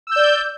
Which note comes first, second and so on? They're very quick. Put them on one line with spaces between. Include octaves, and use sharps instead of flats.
E6 G6 D5